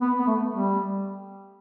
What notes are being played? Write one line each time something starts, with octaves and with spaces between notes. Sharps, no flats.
B3
B3
A3
G3